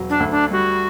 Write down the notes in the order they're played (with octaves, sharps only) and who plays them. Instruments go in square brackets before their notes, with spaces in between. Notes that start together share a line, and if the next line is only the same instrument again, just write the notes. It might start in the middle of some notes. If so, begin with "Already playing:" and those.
Already playing: [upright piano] E1 F#3
[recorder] D4
[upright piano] D2
[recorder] D4
[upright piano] G3 [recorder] F#4